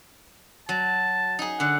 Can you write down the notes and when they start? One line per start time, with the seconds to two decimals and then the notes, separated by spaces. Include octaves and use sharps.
0.69 F#3 A5
1.39 D#4 G#4
1.60 D3 F#5